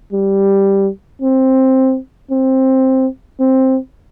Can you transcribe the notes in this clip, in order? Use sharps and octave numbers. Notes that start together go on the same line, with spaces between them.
G3
C4
C4
C4